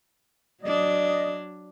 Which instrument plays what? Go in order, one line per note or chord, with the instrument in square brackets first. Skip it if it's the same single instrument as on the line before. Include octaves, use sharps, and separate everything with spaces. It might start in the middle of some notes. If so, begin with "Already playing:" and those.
[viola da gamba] F#3 D4 [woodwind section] D5 D#5